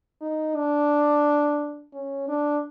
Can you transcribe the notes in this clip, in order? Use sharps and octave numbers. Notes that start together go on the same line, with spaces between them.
D#4
D4
C#4
D4